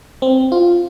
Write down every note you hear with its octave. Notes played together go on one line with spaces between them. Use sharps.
C4
F4